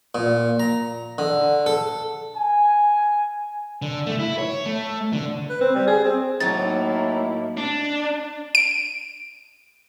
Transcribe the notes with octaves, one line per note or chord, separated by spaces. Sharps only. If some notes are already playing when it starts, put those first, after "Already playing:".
A#2
A#5
D3
A4
G#5
D3
A3
E4
C#5
A3
D3
B4
C4
G3
G#4
C4
A2 F#3 A#3 D#4 E4 A6
D4
D7